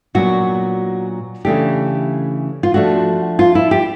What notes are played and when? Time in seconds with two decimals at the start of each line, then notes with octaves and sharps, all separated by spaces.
0.15 A#2 F#3 B3 D4 F#4
1.45 C#3 E3 A3 D4 G4
2.63 F4
2.74 F3 A3 D4 F#4
3.39 F4
3.55 E4
3.71 G4